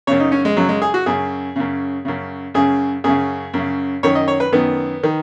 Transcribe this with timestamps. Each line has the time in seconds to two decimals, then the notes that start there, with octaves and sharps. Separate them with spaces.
0.07 F#2 C#3 C#5
0.20 D#4
0.32 C#4
0.45 G#3
0.57 F#2 C#3 F#3
0.69 G#3
0.82 G#4
0.94 F#4
1.06 F#2 C#3 G#4
1.56 F#2 C#3
2.05 F#2 C#3
2.54 F#2 C#3 G#4
3.04 F#2 C#3 G#4
3.54 F#2 C#3
4.03 F#2 D#3 C#5
4.15 D#5
4.28 C#5
4.40 B4
4.53 F#2 D#3 B3
5.04 D#3